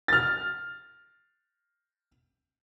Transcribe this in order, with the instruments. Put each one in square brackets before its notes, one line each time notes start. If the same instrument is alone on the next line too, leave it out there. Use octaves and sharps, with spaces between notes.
[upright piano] F6 A6